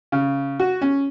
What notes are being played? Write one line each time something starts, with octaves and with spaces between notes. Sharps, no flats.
C#3
F#4
C#4